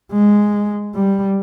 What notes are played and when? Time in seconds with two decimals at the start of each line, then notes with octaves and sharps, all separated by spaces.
0.12 G#3
0.95 G3